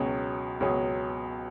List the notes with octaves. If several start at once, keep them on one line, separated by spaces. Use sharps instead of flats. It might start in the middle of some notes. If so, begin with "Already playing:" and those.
Already playing: C#2 B2 F#3 C#4 G#4
C#2 B2 F#3 C#4 G#4